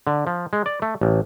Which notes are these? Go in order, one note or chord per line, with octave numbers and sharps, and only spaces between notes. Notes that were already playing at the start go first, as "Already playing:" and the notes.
D3
F3
G#3
D5
A3
A1